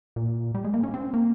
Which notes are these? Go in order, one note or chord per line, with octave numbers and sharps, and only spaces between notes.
A#2
G3
G#3
A#3
C#4
C4
A#3